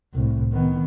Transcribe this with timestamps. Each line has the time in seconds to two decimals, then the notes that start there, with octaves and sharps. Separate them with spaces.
0.14 C2 A2
0.52 D#3 B3